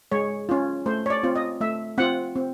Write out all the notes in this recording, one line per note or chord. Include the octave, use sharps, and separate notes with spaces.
G#3 C#5
C#4 F4
A3 C5
C#5
D5
C4 F4
D#5
A3 E5
C4 F4 F#5
C4